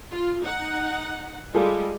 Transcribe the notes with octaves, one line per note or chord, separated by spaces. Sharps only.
F4
D#4 F#5
G3 G#3 F4 G#4 A4